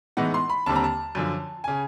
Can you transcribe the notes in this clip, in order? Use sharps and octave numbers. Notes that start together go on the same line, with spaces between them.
A2 E3 G#3 B3 D#4 F#5
C6
B5
D#2 D3 G3 C4 A5
A#5
A5
F#2 D3 F3
C#3 G#5